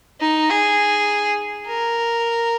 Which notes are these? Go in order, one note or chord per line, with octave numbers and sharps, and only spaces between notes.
D#4
G#4
A#4